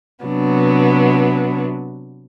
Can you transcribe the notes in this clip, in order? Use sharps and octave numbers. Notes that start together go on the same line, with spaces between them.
C3 F#3 B3 D4